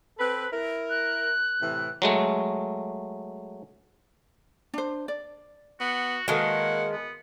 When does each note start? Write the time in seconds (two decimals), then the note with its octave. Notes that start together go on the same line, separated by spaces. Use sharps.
0.18 C4 A4 B4
0.52 E4 A#4
0.90 F#6
1.61 A2 C3 E3
2.02 F#3 G#3 A3
4.74 D4 C5
5.08 D5
5.80 B3 F#4
6.28 D#3 G#3 A#3 F#4 A4 B4 F#5
6.92 B3